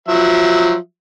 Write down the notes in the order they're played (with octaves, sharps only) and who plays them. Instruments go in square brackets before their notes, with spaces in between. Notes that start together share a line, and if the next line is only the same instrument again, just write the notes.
[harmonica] F3 F#3 E5